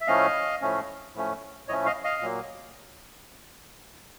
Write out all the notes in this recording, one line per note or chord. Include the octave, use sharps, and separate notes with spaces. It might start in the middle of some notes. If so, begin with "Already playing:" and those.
E5
A2 F3 A3 C#4 D#5 F5
A2 F3 A3 C#4
A2 F3 A3 C#4
A2 F3 A3 C#4 C#5 D#5
D#5 F5
D#5 F5
A#2 F#3 A#3